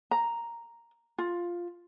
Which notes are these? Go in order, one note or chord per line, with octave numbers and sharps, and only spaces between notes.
A#5
F4